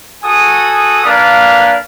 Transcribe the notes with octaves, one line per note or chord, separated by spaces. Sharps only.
F#4 A4 G#5 D#6
A#3 D4 B4 D5 F5